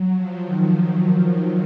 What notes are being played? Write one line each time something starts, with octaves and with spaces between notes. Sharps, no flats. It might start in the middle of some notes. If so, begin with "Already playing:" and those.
Already playing: F#3
F3
D#3
D#3